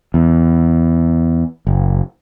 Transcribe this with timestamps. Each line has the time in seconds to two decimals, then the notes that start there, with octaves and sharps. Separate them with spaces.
0.14 E2
1.67 F#1